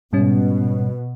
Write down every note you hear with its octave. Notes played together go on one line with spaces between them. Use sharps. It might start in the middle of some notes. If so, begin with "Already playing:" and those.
G#2 B2 G3 C#4